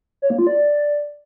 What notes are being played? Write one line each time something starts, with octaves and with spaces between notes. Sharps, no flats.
C#5
A#3
F4
D5